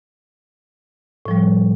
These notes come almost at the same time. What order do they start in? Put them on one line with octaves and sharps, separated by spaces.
A2 F3 G3